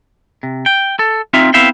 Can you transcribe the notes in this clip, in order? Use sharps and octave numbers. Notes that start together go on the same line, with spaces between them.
C3
G5
A4
C4 D#4 F4 E5 F5
B3 C4 E4 E5 F5 G5